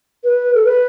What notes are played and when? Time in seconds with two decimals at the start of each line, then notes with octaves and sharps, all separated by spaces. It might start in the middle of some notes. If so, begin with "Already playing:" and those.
0.24 B4
0.55 A4
0.65 B4